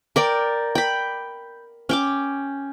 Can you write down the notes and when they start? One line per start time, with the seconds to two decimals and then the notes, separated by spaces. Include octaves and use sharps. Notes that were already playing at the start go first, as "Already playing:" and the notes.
0.16 A#4 D5 G5
0.75 G5 B5
1.89 C#4 G5 D6